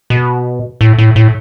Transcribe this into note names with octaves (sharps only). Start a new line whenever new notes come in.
B2
A2
A2
A2